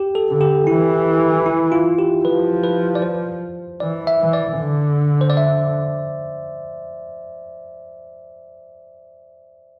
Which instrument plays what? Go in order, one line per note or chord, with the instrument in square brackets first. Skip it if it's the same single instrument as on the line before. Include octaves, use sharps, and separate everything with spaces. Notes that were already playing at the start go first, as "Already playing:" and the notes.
Already playing: [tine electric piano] G4
A4
[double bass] D3
[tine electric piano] G4
[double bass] E3 [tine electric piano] E4
[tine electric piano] E4
F4
G4
[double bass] F3 [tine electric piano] B4
[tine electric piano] B4
D5
C5
[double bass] E3 [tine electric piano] D5
[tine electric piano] E5
[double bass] E3
[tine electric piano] D5
[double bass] D3
[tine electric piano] C5
D5
E5